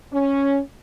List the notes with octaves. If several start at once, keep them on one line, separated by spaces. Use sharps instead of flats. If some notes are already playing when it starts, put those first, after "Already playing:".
C#4